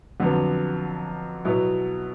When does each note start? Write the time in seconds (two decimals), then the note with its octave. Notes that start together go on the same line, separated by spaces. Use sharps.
0.20 F2 D3 F#3 B3
1.45 B2 F#3 B3 E4